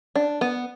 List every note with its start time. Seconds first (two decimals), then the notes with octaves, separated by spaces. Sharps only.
0.15 D4
0.41 B3